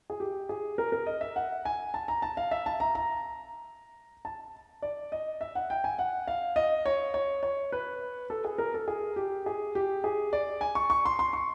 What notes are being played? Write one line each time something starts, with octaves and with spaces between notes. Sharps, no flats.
G#4
G4
G#4
A#4
A#4
D#5
E5
F#5
G#5
A5
A#5
A5
F5
E5
A5
A#5
A#5
A5
D5
D#5
E5
F#5
G5
G#5
F#5
F5
D#5
C#5
C#5
C#5
B4
A4
G#4
A#4
A4
G#4
G4
G#4
G4
G#4
D5
G#5
C#6
C#6
C6
C6
C#6